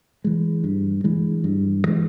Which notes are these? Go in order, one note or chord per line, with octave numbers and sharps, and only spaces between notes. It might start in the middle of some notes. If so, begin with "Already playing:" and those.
E3 G#3
G2
E3 G#3
G2
E3 G#3